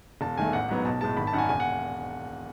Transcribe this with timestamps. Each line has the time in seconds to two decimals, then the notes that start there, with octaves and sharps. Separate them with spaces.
0.21 E1 A5
0.37 E2 D#3 A3 G#5
0.53 A1 F#5
0.69 G#2 F#3 B3
0.85 B1 A5
1.01 A2 G#3 A5
1.17 G#1 B5
1.27 A5
1.33 F#2 D#3 F#5
1.38 G#5
1.49 E1 G#5
1.60 F#5